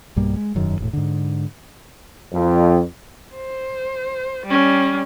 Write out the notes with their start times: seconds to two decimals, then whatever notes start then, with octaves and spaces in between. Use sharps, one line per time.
0.16 B1 G2 G3 A#3
0.37 G#3
0.55 E1 F#2 D#3
0.78 E1 A2
0.93 G#2 D3
2.33 F2
3.35 C5
4.45 G3 C#4